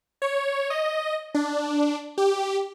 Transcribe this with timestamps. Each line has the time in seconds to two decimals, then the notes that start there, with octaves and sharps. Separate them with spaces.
0.22 C#5
0.70 D#5
1.35 D4
2.18 G4